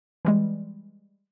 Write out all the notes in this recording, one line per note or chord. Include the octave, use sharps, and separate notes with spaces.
E3 G3 G#3